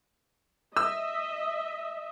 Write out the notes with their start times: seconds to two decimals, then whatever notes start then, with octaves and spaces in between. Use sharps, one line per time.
0.77 D#5 E5 E6